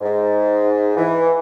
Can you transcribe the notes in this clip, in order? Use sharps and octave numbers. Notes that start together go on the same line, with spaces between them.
G#2
E3